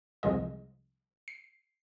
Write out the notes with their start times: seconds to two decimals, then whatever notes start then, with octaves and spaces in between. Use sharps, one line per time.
0.23 C2 F3 G#3 D#5
1.28 C7